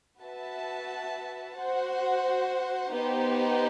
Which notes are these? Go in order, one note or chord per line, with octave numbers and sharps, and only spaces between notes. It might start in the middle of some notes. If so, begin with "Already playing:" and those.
F#4 B4 E5 A5
F#4 C5 F#5
B3 D#4 G4 C5